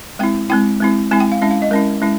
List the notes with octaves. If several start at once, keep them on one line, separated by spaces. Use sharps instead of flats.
G#3 C4 E4 G5
G#3 C4 E4 G5
G#3 C4 E4
G#3 C4 E4 G#5
G5
F5
G#3 C#4 E4 E5
F5
D#5
G#3 C#4 E4 A#4
G#3 C#4 E4